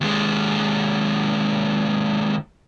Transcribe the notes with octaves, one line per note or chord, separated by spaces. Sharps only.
D#2 G#3